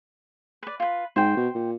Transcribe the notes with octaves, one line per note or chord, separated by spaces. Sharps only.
B4 D5
F4 B4
G#2 C5 G5
B2
A#2